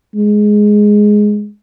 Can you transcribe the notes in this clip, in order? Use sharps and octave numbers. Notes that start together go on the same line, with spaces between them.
G#3